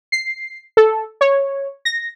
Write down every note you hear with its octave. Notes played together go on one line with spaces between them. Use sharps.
C7
A4
C#5
A#6